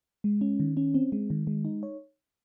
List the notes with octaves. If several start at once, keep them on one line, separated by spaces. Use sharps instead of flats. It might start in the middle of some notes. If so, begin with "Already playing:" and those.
G#3
C#4
D#3
C#4
C4
G#3
D#3
G#3
D#4
C#5